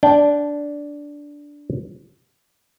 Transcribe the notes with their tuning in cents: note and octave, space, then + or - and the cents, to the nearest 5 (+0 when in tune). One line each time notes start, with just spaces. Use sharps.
D4 -10 G5 +10